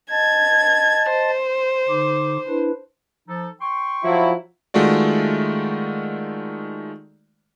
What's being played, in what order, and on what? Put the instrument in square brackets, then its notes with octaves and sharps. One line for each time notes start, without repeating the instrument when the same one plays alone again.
[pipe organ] D#5 A5 A6 [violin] G#6
[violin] C5
[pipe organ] D3 D#4 D6
D4 E4 B4
[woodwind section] F3 D#4 A4
G5 C6 C#6
[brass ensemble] F3 F#3 E4
[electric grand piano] D#3 G#3 A3 F4 F#4 D5